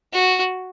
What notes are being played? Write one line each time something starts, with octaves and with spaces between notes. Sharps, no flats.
F#4